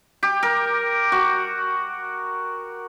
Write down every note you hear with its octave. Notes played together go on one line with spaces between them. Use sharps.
G4
A#4
F#4